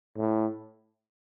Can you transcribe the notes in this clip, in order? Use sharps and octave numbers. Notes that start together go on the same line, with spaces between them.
A2